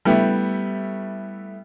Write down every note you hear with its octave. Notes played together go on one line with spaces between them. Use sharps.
G3 A3 B3 E4 G4